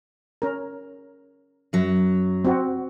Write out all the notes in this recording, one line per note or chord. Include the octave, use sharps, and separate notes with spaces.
C#4 A#4
F#2 F#3
C4 F#4